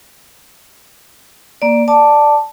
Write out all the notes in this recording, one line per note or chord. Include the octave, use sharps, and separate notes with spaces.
A#3 D5
D5 A5 D6